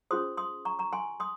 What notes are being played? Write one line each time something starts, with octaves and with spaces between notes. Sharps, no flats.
C#4 F4 G#4 C5 C6 D#6
C6 D#6
A#5 C#6
A#5 C#6
G#5 C6
C6 D#6